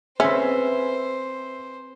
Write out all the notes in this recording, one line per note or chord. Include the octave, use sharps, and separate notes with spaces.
C4 C#4 G#4 B4 C5 E5